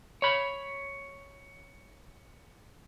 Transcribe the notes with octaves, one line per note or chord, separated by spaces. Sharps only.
C#5 B5